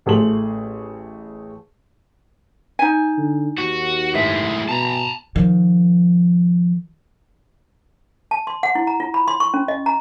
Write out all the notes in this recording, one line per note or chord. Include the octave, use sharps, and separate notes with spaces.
A1 A3 G#4 C6 F#7
D#4 G#5
D3
D#2 F#4
A2 G#3 E5
B2 A5 A#5
D#3 F3
A5
C6
F#5
E4
A#5
F4
B5
C6
C#6
C#4
D#5
A#5